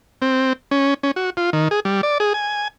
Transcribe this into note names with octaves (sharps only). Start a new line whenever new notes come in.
C4
C#4
C#4
F#4
F4
D#3
G#4
G3
D5
G#4
G#5